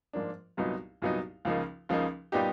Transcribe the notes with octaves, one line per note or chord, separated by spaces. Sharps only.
G#2 F3 A#3 D4
C2 A#2 F#3 B3 D#4
C2 A#2 F#3 B3 D#4
C#2 C#3 F3 A#3 D#4
C#2 C#3 F3 A#3 D#4
A#2 G3 B3 D#4 G4